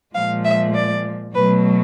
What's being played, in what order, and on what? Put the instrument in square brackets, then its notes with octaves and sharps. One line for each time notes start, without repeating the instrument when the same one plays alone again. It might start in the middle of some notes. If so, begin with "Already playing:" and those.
[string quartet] A#2 F3 G#3 F5
E5
D5
B2 F#3 A3 B4